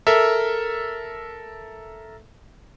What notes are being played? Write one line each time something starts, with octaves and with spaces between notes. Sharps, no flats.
A4 A#4 E5